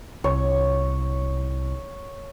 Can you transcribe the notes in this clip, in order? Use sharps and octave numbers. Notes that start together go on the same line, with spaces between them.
C2 C#5